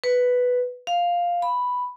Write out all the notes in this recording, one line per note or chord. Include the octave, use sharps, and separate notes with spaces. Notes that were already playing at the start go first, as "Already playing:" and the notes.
B4
F5
B5